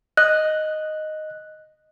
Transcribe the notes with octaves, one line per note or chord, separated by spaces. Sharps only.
D#5 F#6